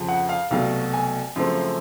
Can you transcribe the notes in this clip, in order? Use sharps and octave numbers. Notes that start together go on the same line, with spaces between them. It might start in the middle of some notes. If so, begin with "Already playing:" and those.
Already playing: F2 C#3 F3
F#5
F5
C2 B2 F#3 A3 F5
G#5
F#2 C#3 F3 A3 C4